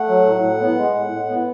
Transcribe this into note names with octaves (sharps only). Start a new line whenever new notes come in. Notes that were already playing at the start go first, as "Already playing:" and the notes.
Already playing: A3 F#5
F#3
A2
A2
B3
G#3
A2
A2
B3